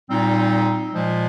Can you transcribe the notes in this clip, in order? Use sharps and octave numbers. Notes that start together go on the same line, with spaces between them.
A#2 G3 C4 D#4
A#2 F3 G#3